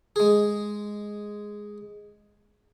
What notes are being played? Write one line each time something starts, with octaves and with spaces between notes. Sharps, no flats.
G#3 G#4